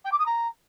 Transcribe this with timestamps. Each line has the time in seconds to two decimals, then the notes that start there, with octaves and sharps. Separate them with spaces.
0.05 G5
0.12 D6
0.19 D#6
0.26 A#5